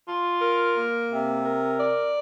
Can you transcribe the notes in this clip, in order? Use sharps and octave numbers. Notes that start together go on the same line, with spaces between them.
F4
A#4
A#3
C3
A#4
D5